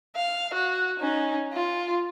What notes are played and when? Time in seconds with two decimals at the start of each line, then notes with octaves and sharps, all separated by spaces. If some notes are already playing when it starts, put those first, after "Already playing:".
0.16 F5
0.54 F#4
1.00 C#4 D#4
1.53 F4